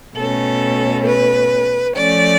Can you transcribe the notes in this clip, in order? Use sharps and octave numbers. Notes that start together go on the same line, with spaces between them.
B2 A3 C#4 A4
B4
F3 A3 C#4 D5